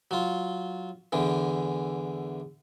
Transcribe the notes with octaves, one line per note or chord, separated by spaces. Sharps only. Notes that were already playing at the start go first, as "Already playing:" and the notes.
F#3 F4
E2 D3 E3